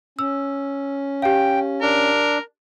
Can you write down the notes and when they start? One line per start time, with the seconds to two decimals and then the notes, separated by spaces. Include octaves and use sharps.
0.19 C#4 E6
1.22 G4 F5 G5
1.82 D4 A#4